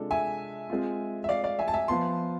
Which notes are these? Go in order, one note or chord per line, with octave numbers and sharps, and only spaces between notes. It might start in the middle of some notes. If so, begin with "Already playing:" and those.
Already playing: C3 G#3 D4 F4 A4
E5 G#5
G#3 C4 F4
E5
D5 F5
D5 F5
E5 G#5
A5
E5 G#5
F3 B3 F4 A5 C6